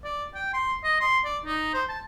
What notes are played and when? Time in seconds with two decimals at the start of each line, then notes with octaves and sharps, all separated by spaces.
0.04 D5
0.35 G5
0.54 C6
0.84 D#5
1.00 C6
1.25 D5
1.46 D#4
1.74 C5
1.89 A5